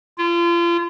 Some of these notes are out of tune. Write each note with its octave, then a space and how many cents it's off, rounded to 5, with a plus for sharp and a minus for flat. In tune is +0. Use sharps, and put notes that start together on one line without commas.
F4 -35